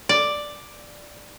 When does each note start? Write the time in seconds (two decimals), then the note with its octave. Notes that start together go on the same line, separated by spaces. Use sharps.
0.09 D5